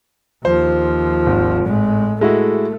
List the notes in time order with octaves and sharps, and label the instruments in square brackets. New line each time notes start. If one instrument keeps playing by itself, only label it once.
[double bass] D#2 F3 [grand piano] C5
[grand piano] G#1
[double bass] A2 G#3
[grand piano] G#3 E4 F#4 [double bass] A3